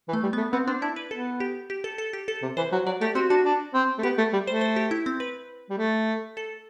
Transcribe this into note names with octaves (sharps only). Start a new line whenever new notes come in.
E3
A3
G3
B3
A3
B3 C4
C4 D4
D4 E4
B4
B3 A4
G4
G4
A4
A4
G4
A4
C3
E3 C5
F#3
F#3 D5
A3 G4
C4 F#4
D4 F#4
D4
C4
A3
B3 G4
A3
G3
A3 C5
C5
G4
E4
C4
B4
G3
A3
A4